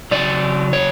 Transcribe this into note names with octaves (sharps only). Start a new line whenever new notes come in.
C#3 F#3 D5
C#5